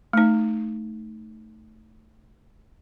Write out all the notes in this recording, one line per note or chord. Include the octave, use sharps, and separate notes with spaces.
A3 D#4